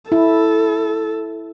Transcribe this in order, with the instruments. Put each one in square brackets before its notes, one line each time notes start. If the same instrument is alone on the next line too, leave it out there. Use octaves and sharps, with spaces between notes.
[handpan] E4 [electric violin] A4